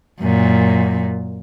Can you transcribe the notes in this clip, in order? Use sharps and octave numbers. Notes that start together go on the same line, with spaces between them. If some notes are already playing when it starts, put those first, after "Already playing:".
F#2 A#2